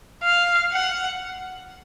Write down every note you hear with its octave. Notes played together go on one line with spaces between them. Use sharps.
F5
F#5